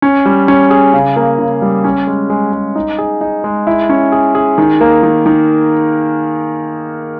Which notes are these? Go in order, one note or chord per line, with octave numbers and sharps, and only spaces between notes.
C#4
G3
C#4
G#4
C#3
A#3
C#3
G3
C#4
G#3
G#3
G#3
D#4
G#4
D#4
G#3
E4
C#4
G#4
G#4
D#3
A#3
D#3
D#3